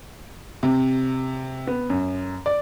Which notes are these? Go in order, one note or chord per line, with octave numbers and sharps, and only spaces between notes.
C3
B3
F#2
D5